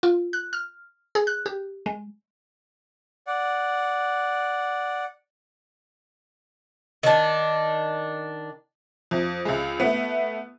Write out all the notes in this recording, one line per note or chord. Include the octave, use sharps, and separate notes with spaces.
F4
F#6
F6
G#4
F#6
G4
G#3
D5 F#5
D#3 D4
F2
C#2 G#3
A3 B3